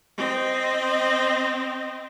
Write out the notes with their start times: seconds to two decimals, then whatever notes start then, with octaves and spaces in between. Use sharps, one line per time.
0.18 C4 D#5